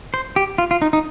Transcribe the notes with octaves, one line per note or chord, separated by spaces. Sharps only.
C5
G4
F4
F4
D#4
D#4